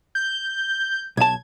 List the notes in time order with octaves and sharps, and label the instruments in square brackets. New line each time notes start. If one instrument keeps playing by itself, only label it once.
[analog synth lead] G6
[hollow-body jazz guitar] B1 A5 [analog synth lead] G#6